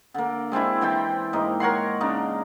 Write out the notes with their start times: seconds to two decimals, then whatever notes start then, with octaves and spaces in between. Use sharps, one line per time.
0.14 D3 A#3
0.52 G#3 C4 D4 E4
0.81 E3 C4 G5 A5
1.33 G#2 A#3 D#4
1.60 A#4 C#5 F#5 C6
2.01 C#3 D4 D#4